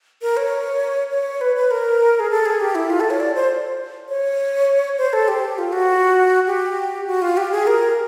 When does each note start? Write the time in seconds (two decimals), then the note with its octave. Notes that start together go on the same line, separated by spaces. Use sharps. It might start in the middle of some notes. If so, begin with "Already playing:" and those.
0.22 A#4
0.37 C#5
1.11 C#5
1.41 B4
1.56 B4
1.71 A#4
2.20 G#4
2.31 A4
2.46 G#4
2.60 G4
2.75 E4
2.90 F4
3.00 A4
3.10 C#5
3.20 D5
3.35 C5
4.09 C#5
4.98 C5
5.13 A4
5.28 G4
5.58 F4
5.73 F#4
6.47 G4
7.07 F#4
7.22 F4
7.37 G4
7.52 G#4
7.67 A#4